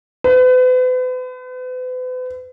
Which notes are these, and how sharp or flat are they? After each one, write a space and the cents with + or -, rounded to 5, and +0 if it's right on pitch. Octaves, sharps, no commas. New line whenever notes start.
B4 +40